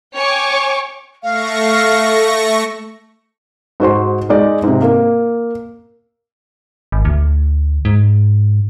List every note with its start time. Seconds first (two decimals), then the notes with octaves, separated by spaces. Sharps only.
0.14 C#5 G5 G#5 C#6 D6
1.22 A3 F5 C#6 A#6
3.80 G#2 F#4 C5 C6
4.29 G#3 D#4 D5
4.63 G#2 C3
4.82 A#3
6.92 G#1
7.05 D2
7.85 G#2